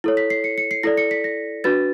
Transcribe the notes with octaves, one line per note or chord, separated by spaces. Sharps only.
E4 A4 C#5
B6
C7
C#7
C#7
C7
E4 A4 D5 A#6
C#7
B6
A#6
D4 F#4 B4 A6